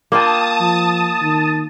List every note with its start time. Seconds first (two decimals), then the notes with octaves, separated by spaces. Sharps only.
0.12 A#3 F4 G5 A5 D#6
0.60 F3
1.22 D#3